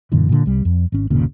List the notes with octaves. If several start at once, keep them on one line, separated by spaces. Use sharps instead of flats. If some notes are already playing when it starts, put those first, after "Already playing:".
F#2 A#2 D3 E3
A#2 D3
C2 G3
F2
G#1 C#4
G1 D#2 A#2 C#3